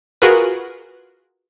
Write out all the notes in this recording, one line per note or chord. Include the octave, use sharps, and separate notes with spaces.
F4 F#4 G#4 A#4 B4